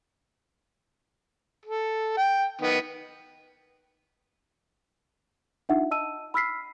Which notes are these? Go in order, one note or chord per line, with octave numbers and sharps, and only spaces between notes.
A4
G5
D#3 B3
D4 D#4 F4 E5 F#5
D#5 A5 E6 D#7
B5 E6 F6 B6 C7